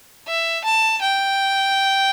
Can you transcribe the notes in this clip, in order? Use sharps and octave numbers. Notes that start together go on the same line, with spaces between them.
E5
A5
G5